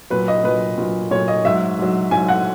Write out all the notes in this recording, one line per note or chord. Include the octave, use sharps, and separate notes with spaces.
A#2 F#3 B4
D#5
A#2 F#3 B4
A#2 F#3
A#2 F#3 C#5
D#5
G#2 F#3 E5
G#2 F#3
G#2 F#3 G#5
F#5